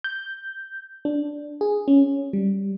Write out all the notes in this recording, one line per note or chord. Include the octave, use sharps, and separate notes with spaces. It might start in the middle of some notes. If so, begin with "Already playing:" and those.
G6
D4
G#4
C#4
G3